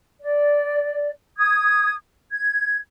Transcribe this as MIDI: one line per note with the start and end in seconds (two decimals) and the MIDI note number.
0.20 1.10 74
1.37 1.95 87
1.37 1.95 92
2.31 2.77 92